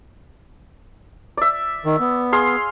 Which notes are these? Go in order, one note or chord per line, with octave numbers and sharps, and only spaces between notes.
D5 E5
D#3
B3
G#4 F5 C6